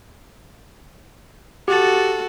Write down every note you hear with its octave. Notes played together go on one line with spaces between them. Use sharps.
F#4 G4 A4 A6